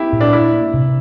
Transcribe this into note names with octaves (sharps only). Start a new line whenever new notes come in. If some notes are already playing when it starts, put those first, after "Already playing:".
Already playing: C4 E4 G4
A#2
D4
A#3 E4
A#3
C3